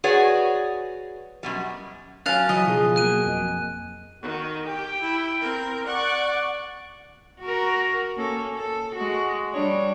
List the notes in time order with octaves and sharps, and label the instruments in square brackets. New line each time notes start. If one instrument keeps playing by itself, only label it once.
[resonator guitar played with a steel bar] F#4 G#4 B4 C#5 D5 F#5
F#2 B2 G3
[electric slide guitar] F#3 C#4 [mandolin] F5 A5 [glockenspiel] G#5 F#6
[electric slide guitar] C#3 E3 [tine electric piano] F#3 [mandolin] D#5
[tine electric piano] B2 G#4 [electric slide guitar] F3 F4
[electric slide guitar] F#3 A#3 [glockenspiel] F#6 D#7
[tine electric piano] G1 F2
[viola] D#3 [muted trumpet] F#4
[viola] G4 [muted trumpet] G5
[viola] E4
C4 A#4
[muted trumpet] D5 [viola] F#5 C#6
[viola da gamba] F#4 A#4
A#3 C#4 A4
A4
G#3 F#4
G3 D4 C#5